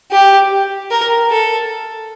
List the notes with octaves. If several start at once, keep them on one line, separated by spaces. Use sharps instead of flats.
G4
A#4
A4